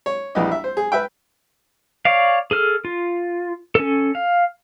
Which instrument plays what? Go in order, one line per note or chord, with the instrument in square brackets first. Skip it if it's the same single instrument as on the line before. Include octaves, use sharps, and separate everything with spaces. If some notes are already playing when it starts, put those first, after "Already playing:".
[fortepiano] C#5
A#1 E3 G3 G4 D#5
E5
C5
G#4
B4 E5 G5
[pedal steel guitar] C#5 D5 F5
G#4 A4 F6
F4
C#4 A4
F5